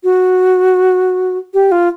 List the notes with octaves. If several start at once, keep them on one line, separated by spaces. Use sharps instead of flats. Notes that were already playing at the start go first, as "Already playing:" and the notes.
F#4
G4
F4